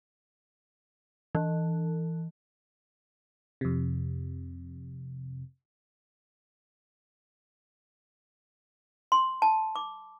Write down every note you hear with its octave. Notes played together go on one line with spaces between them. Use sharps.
E3
F2 C3
C6
A5
D6